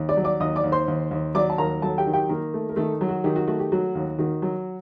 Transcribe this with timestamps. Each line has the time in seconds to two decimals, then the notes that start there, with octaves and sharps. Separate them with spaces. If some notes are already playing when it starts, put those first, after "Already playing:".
Already playing: D#2
0.09 D5 D6
0.17 F#3
0.24 D5 D6
0.40 D#2 D#5 D#6
0.56 D5 D6
0.64 D#2
0.72 C5 C6
0.88 D#2
1.11 D#2
1.35 F#3 D5 D6
1.50 A5
1.58 D#2 A#4 A#5
1.82 F#3 A4 A5
1.98 G4 G5
2.06 D#3
2.13 G4 G5
2.29 D#3 A#3 A#4
2.54 A3
2.69 A#4
2.76 D#3 A3 A4
3.01 F#3
3.09 F#4
3.24 D#3 G4
3.36 F#4
3.48 A3 F#4
3.59 G4
3.72 F#3 F#4
3.95 D#2
4.19 D#3 F#4
4.42 F#3